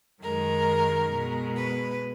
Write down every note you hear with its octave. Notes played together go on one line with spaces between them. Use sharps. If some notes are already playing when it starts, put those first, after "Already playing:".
F#2 D#3 G#3 A#4
B2 G#3
B4